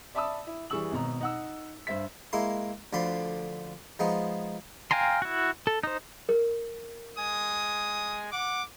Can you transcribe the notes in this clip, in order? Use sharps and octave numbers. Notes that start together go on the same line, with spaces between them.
D5 E5 A5 B5 D#6 E6
E4
E3 G3 G#4 C#6 E6 F#7
G#1 B2 A#5
D#4 F#5 E6
G2 C5 E5 B6
G#3 A#3 E4 C6
D2 D3 F3 B5 C6
F3 G#3 B3 D#4
F5 G5 G#5 A#5 C6
E4 F#4
A4
D#4 C5
A#4
G#3 G#5 D#6
F#5 D6